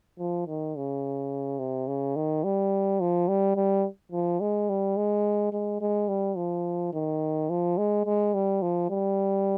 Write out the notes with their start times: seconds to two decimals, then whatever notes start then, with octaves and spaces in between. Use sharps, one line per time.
0.19 F3
0.47 D#3
0.76 C#3
1.59 C3
1.87 C#3
2.16 D#3
2.44 G3
3.01 F3
3.28 G3
3.56 G3
4.12 F3
4.40 G#3
4.69 G3
4.97 G#3
5.53 G#3
5.81 G#3
6.08 G3
6.36 F3
6.93 D#3
7.50 F3
7.78 G#3
8.05 G#3
8.34 G3
8.62 F3
8.90 G3